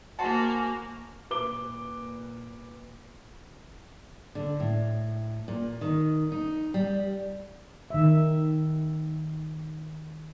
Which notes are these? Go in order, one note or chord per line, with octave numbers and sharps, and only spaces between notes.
A#3 F#4 C5 F#5 G#5 A5
A#2 B4 D6 G7
D3
A2
A#2
D#3
D#4
G3
D#3 E5